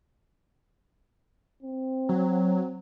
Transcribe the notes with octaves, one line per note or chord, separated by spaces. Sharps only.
C4
F#3